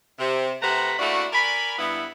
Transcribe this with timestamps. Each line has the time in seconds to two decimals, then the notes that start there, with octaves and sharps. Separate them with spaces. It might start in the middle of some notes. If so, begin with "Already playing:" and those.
0.18 C3
0.62 C3 A3 B4 F#5 A#5 B5
0.99 A3 A#3 D4 E4 F#4
1.33 A#4 D5 G#5 B5
1.78 G2 B3 E4